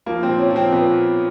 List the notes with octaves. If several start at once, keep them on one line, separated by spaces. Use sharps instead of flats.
F3 A#3
C4
A#2
C#4
F3
C4
A#2 B3